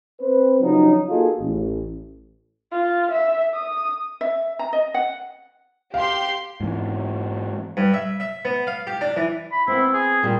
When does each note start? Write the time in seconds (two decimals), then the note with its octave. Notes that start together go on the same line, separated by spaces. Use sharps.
0.20 C4 B4 C5
0.61 C#3 F3 F#3 D4 D#4
1.08 A#3 D#4 F4 F#4 G#4 A4
1.40 A1
2.72 F4
3.11 E5
3.54 D#6
4.21 E5
4.59 A#5
4.73 D#5
4.94 F#5
5.94 G4 F5 C6
6.61 G#2 E3
7.77 G2
7.94 E5
8.20 E5
8.45 B3
8.67 F5
8.87 G4
9.01 D4
9.16 E3
9.52 B5
9.68 B3 C4 E4
9.93 G#4
10.23 A#2 G3